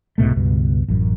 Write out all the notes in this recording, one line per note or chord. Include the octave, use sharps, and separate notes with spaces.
C2 G#2 B2 A3
C#2 G2 B2
A1 F#2